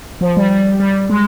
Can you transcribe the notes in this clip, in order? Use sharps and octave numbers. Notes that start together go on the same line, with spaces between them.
F3
G3
G3
G3
G#3